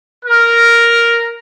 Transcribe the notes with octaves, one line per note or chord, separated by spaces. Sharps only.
A#4